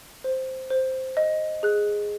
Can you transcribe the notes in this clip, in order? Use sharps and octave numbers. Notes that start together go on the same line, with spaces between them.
C5
C5
D#5
G#4 F#6